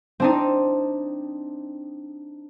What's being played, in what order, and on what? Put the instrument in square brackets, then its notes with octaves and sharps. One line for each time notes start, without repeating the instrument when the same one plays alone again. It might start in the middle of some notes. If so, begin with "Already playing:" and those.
[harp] C4 D4 D#4